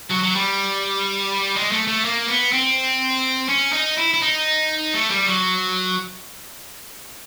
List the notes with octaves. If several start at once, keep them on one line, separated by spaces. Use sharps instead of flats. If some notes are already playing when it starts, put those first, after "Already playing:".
F#3
F#3
G3
G#3
A3
A3
A#3
B3
C4
C#4
D#4
E4
E4
D#4
A3
G3
F#3